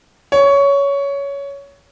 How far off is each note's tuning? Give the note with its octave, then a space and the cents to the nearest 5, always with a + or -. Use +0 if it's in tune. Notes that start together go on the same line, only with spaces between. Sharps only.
C#5 +15